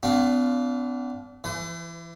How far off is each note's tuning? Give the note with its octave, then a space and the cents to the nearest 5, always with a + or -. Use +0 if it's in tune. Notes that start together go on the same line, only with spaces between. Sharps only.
B3 +35 D4 -35 F4 +0
E3 +25 C5 -45